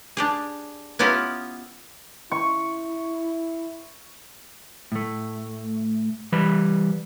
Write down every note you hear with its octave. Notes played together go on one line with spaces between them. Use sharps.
D4 G4 G#4
B3 C#4 E4 F4 G4 D#5
E4 C#6
A2 A3
E3 G3 B4 B5